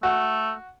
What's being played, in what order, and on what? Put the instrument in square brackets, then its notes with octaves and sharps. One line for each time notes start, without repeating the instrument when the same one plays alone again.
[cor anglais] A3 [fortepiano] F#4